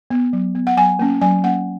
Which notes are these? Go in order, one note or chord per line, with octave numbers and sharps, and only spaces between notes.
B3
F#3
B3
F#5
F#3 G#5
A#3 C#4
F#3 G#5
A#3 C#4 F#5